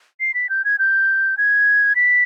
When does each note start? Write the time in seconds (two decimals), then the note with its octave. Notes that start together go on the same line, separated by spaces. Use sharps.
0.20 C7
0.34 B6
0.50 G6
0.65 G#6
0.79 G6
1.38 G#6
1.96 B6